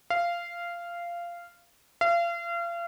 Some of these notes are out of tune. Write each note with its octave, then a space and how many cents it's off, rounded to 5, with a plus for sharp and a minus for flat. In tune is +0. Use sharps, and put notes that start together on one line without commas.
F5 -15
F5 -35